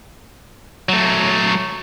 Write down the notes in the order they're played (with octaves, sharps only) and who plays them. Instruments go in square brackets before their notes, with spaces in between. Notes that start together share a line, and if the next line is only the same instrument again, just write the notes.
[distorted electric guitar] F#3 A3